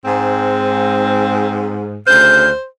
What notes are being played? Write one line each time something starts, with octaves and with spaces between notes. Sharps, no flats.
G#2 C4
D2 C#3 C5 F5 G6